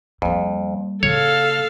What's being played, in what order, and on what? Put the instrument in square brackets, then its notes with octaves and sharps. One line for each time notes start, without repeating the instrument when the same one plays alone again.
[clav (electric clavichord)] F2 [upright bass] G3 A#3
[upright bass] C#3 A#3 [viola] A4 F5 [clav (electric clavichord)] C#5